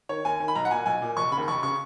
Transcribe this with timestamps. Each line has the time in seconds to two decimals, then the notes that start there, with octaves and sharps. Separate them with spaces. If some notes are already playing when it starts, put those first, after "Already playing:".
0.09 D#3 C#5
0.25 D#2 G#5
0.40 D#3
0.48 B5
0.55 B1 A#5
0.65 F#5
0.71 A#2 G#5
0.86 B1 G#5
1.02 A#2
1.17 F1 C#6
1.32 C#3 B5
1.37 D#2
1.48 F1 C#6
1.63 C#3 C#6